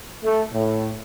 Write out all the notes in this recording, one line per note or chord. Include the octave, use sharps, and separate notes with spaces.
A3
A2